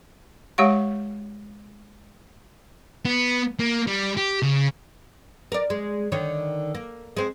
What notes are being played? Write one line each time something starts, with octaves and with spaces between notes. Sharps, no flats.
G#3 G4 C#5 F5 F#5 C#6
B3
A#3
G3
G4
C#3
A#4 D5
G#3
D3 D#3 C#5
A#3
G#3 C4